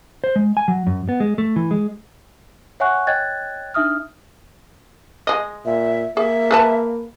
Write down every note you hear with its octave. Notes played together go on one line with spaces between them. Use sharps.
C5
G#3
G#5
F#3
F#2
B3
G#3
A3
E3
G#3
C#5 E5 F#5 G#5 C#6 F#6
C#5 D#5 G5 F#6 G#6 A6
D4 D#4 E5 D#6 F6
G#3 D#5
A#2 E5
A#3 G#4 E5
G#4 B4 A5